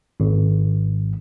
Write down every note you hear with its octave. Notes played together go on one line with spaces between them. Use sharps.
G#1